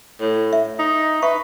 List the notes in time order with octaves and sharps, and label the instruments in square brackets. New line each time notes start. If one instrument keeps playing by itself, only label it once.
[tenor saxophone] A2
[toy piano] E5
[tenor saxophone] D#4
[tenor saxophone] B4 [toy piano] E5 C#6